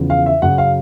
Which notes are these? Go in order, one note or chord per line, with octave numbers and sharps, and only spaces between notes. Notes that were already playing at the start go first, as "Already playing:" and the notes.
Already playing: E2 C#3 F3
F5
E5
F#2 C#3 F#3 F#5
F5